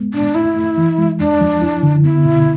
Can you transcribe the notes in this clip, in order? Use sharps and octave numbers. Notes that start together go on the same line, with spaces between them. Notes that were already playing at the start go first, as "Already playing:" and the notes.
Already playing: G#3 B3
A2 D4
A3 E4
A3
E3
G#3
E2 D4
F3
E4
D3
B3 E4
B2